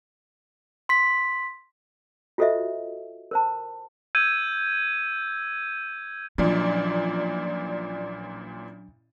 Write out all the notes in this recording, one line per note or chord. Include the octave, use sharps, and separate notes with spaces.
C6 B6
F4 F#4 A4 C5 D#5 E5
A#4 C5 A5
E6 G6 G#6 D#7
A1 A#2 F3 F#3 D4 D5